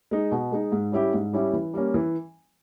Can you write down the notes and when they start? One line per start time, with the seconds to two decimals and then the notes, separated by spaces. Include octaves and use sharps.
0.11 G#3 D#4
0.32 B2
0.52 G#3 D#4
0.72 G#2
0.92 G3 C#4 E4 G4
1.13 G#2
1.33 G3 C#4 E4 G4
1.53 E3
1.74 G3 A#3 C#4
1.94 E3